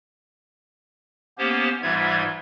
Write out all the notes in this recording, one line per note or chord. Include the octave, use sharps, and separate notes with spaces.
A#3 B3 C#4 G4 C5
G#2 E3 G3 F4 E5 G#6